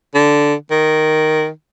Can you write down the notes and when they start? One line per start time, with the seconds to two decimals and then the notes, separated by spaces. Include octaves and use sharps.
0.15 D3
0.71 D#3